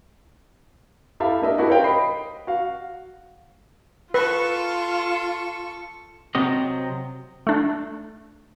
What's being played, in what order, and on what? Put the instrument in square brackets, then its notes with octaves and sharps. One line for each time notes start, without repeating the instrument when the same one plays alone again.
[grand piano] E4 G4 A4 E5 F5 A5
A#3 D4 D#5 E5
A#3 D#4 E4 F#4 G4 A4
A#4 C5 C#5 F5 G5
D#5 B5 C7
F#4 F5
[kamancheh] F4 [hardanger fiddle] A4 C#6 [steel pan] B4
[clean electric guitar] C3 F#3 C4 D#5
[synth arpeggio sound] A3 D4